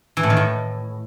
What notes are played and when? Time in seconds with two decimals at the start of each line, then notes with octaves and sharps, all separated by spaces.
0.17 E3
0.23 A2
0.30 D#3
0.37 A2